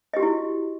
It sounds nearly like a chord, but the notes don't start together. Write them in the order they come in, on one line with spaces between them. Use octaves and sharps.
D#5 G4 F#4 E4